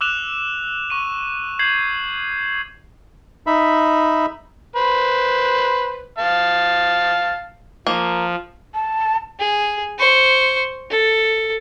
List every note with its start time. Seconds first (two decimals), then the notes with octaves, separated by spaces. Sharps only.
0.01 D6 E6 F#6 E7 F7
0.90 C#6 D#7
1.59 G6 G#6 C7 F#7
3.47 D#4 E5 B5
4.76 B4 C5
6.18 F5 A5
7.87 F3 A#3
8.74 A5
9.39 G#4
9.99 C5 C#6
10.90 A4